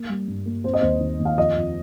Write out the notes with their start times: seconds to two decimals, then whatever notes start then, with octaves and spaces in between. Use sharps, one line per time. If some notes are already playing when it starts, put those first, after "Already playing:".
Already playing: A#3
0.09 G3
0.28 G2
0.46 A#3
0.64 C4 C5
0.74 D#5
0.81 D#2 C5
1.00 D#3
1.19 D#2
1.25 F5
1.37 F2 D#5
1.56 F2